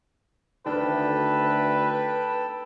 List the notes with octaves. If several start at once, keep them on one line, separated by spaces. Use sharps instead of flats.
D2 D#3 D4 A4 B4 G5 A5